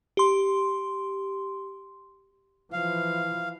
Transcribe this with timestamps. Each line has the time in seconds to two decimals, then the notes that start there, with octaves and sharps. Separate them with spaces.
0.17 G4 C6
2.73 E3 F3 F5